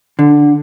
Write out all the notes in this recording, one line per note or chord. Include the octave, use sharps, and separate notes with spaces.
D3